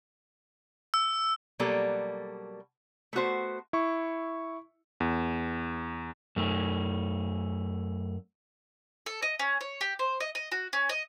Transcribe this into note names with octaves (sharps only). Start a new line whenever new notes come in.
E6
B2 F#3 G3 A#3 A4
A3 B3 F#4 C5
E4 C#6
E2
F#2 A3
A4
D#5
C#4
C#5
G4
C5
D#5
D#5
F#4
C#4
D#5